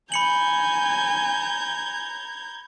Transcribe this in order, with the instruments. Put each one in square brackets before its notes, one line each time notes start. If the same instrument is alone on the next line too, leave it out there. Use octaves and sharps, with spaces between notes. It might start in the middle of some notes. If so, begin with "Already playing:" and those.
[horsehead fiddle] G#5 [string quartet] A#5 G6 G#6 [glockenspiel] B5 C#7 F#7